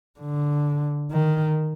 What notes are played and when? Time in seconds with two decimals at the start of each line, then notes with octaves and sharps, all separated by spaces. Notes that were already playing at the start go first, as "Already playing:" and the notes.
0.20 D3
1.11 D#3